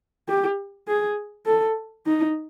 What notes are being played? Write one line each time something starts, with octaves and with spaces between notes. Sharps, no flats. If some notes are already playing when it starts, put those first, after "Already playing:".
G4
G#4
A4
D#4